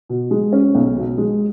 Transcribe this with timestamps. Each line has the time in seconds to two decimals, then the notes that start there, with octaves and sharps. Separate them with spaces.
0.09 B2
0.31 G#3
0.53 C#4
0.75 B1
0.96 B2
1.18 G#3